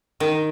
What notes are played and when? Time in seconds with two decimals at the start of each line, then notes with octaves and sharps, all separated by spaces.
0.20 D#3